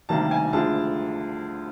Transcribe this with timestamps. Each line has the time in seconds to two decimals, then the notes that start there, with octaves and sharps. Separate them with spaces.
0.09 D2 C3 D#3 G3 A#3 A5
0.31 G#5
0.53 D2 D3 F3 G#3 A5